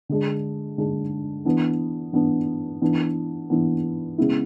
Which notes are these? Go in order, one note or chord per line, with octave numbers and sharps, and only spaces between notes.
D3 G#3 D4
D3 G#3 D4
E3 B3 D4
E3 B3 D4
E3 B3 D4
E3 B3 D4
C#3 G#3 B3 E4